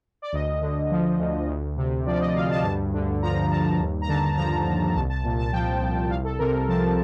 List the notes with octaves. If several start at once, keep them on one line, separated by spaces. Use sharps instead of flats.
D5
D2 D#5
D3
F3
D2
D2
C3
F3 D5
D#5
D2 F5
A5
G2
D3
F3 A#5
G2 A5
D#2
A#5
D3 A5
F3 A#5
D#2
C2 A5
A5
A#2
A5
F3 G5
C2
C2 F5
A4
C3 A#4
F3 A5